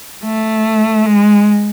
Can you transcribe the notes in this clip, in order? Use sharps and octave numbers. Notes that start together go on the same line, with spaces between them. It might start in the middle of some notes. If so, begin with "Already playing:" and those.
A3
G#3